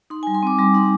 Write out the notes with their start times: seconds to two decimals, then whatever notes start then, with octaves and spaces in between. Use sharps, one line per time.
0.10 D#4 C6
0.23 G3 G#5
0.35 C6
0.43 C4 D6
0.59 G3 C6
0.74 D#4